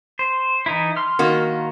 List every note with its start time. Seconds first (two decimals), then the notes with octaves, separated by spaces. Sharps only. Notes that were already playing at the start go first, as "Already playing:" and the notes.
0.19 C5
0.66 E3 D#4 E4
0.97 C6 F6
1.19 D#3 A#3 F#4